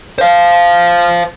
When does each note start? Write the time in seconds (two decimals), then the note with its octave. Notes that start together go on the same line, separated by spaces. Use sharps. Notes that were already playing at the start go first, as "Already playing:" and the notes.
0.18 C5 F5